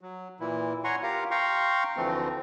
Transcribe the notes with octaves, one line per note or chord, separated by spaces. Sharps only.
F#3
A#2 E3 E4
C#5 F#5 G#5 A#5 C6 C#6
F4 G4 A#4 F5 A#5
F5 G5 A#5 C6 C#6
D2 E3 F3 A3 C4